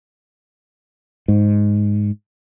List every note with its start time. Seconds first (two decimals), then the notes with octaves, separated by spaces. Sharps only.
1.28 G#2